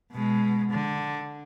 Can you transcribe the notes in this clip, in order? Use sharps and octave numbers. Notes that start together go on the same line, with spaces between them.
B2 G#3
D3